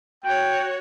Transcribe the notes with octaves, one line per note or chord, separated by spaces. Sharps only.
F#4 C#5 G5